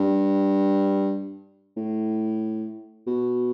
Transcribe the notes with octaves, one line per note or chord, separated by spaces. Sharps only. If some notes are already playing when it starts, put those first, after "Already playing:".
Already playing: G2
A2
B2